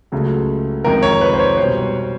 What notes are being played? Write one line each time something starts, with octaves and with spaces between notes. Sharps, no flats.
C#2 C#3 F#3 A3
F2 C3 D#3 G#3 A#4
C#5
B4
C5
C#5
B2 G3 C5